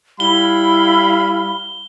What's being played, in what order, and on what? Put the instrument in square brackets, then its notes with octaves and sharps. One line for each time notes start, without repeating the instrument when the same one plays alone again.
[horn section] G3 F5 B5 [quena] E4 [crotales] G7